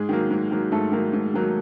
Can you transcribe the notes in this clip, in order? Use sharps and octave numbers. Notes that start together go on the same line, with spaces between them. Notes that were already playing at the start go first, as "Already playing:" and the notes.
Already playing: G#2 G#3 G#4
D#3 F#3 A#3
G#2
D#3 F#3 A#3
G#2 A3 A4
D#3 F#3 A#3
G#2
D#3 F#3 A#3